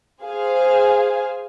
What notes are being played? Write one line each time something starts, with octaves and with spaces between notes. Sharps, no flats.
G#4 C5 F5 G#5